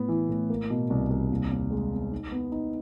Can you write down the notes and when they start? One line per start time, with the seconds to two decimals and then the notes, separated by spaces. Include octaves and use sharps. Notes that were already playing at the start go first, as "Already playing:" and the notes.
Already playing: A2 B3
0.09 E3
0.29 A2
0.50 A#3
0.70 B2
0.90 C2
1.10 C2
1.31 D#2
1.51 D#2
1.71 G#3
1.91 B3
2.11 D#4
2.32 B3
2.52 D#4